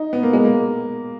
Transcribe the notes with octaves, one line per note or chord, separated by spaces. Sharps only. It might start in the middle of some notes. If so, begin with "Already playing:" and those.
Already playing: D#4
B3
A#3
G#3
A#3